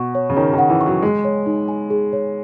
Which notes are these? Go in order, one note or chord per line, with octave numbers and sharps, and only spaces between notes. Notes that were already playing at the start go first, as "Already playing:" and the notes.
Already playing: B2 F#5 C#6
C#5
C#3
D#3 C#5
D#3 F#5
E3
C#6
F#3
G#3 G#4
C#5
D#4
G#5
G#4
C#5